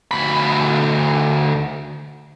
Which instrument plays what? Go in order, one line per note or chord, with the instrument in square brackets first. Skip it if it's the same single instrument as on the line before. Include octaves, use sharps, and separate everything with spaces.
[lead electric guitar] D2 B5